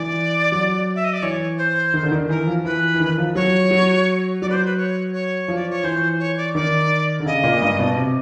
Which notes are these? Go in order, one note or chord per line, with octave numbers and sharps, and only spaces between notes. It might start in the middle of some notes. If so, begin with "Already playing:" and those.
Already playing: E3 D5
F#3
E5
D#5
D5
E3 C#5
C5
D#3
D3
D#3
E3 A#4
F3
E3 B4
E3
D#3
F3
F#3 C#5
F#3
F#3 D5
B4
C5
B4
C#5
C#5
F3
D5
C#5
E3 C5
C#5
D5
D#3 D5
D3
C#3 D#5
A#2
G2
B2
C3